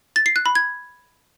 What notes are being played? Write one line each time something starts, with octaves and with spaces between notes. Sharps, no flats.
A6
C7
F#6
B5
G#6